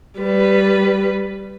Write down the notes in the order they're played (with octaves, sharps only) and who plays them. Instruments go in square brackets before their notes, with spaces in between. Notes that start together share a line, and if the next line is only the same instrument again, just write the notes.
[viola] G3 B4